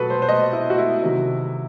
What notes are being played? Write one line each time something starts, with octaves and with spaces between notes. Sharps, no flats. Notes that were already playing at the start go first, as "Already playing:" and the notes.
Already playing: B2 F#3 A4 B4
C5
C5
D#5
E4
F#4
E4
C3 D#3 F#3